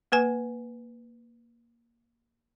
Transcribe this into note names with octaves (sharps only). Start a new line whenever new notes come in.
A#3 B4 G#5